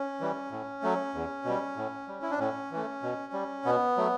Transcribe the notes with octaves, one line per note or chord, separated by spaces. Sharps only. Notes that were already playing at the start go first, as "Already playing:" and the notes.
Already playing: C#4
E3 G3
A2
F#3 A3
E2
B2 G3
A2
G3
E4
D4
A2 C#4
E3 A3
B2
G3
B2 B3
F#3 A3